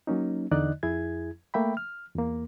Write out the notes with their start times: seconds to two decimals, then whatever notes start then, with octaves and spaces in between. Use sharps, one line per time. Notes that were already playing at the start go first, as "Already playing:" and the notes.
0.07 F#3 A#3 C#4 D#4
0.52 E2 D3 D#4 D5 D#5 F#6
0.83 F2 E4 G#4 G#6
1.54 A3 A#3 E5 G5 B5
1.77 F6
2.15 E2 A#3